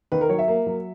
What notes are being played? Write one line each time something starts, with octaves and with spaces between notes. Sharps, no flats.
D#3 B4
A#4
F#3 C#5
E5
A#3
F#3